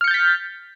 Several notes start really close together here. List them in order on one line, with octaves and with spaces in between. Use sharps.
F6 C#7 G6 A6 B6